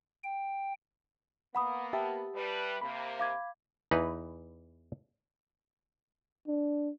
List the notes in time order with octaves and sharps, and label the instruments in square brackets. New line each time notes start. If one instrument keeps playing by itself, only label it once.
[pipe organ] G5
[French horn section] A#3 B3 [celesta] F#5 B5 D#6
[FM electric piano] G4 E5 A5
[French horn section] G3 B4
[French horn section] C3 A#3 [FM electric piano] B5
[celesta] F5 D6 G#6
[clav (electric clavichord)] E2 E3 D#4 B4
[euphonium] D4